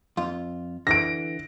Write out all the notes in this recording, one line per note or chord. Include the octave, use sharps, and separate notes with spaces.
F2 F4
D3 E3 A#6 D7